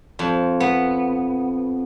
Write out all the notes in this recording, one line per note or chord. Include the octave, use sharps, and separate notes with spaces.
F2
B3